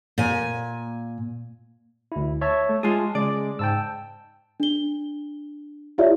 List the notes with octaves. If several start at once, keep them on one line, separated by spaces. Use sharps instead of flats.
A#2 G#5
D2 E4
C#5 E5 A5
A3
G#3 F4 G#4 A5
C#3 G#3 D5
G#2 G5 A5 E6
D4 G7
E4 F4 G4 C#5 D5 E5